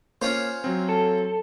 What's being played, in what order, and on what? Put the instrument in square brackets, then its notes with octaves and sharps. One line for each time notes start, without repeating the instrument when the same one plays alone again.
[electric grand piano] A#3 [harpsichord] C#4 F4 C5
[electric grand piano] F#3 C4
[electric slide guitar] A4